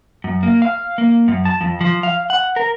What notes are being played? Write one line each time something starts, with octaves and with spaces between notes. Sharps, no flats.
F#2
A#3
F5
A#3
F#2
A5
F2
F3
F5
F#5
A#4